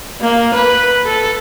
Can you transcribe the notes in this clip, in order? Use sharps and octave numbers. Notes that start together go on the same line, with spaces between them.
A#3
B4
A4